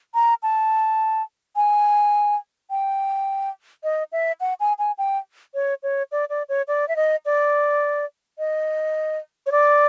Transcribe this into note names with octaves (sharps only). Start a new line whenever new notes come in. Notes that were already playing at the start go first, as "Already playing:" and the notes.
A#5
A5
G#5
G5
D#5
E5
F#5
G#5
G#5
G5
C#5
C#5
D5
D5
C#5
D5
E5
D#5
D5
D#5
C#5
D5